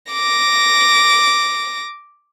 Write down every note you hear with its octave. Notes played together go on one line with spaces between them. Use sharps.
D6 A#6